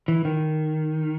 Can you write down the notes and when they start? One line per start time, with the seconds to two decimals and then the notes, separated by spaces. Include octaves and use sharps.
0.08 E3
0.25 D#3